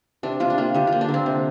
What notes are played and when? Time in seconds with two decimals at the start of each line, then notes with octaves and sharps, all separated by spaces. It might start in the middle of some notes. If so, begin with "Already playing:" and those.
0.23 C3 D4
0.40 C3 F4
0.50 D4
0.58 A#3 F4
0.74 D3 G4
0.87 F4
0.92 A#3
1.01 D4
1.09 D3
1.14 C4
1.26 C3